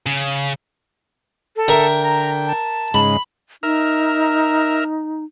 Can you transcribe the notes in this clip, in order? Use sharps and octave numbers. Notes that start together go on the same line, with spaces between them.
C#3
A4
D3 A#4 E5 G5
A#5
A5
G#2 C#3 G#3 B5
D#4 A#4 E5 F6